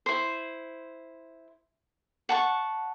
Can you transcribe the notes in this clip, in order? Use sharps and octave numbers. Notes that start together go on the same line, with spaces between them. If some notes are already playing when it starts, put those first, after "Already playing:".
E4 C5
F#5 A5 C#6